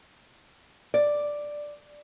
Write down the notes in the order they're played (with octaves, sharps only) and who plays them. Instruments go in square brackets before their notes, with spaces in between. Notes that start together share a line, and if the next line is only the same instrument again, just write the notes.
[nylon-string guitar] D5